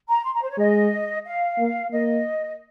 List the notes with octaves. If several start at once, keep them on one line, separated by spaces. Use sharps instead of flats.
A#5
C6
A#5
C5
C#5
G#3 D#5
F5
A#3
A#3 D#5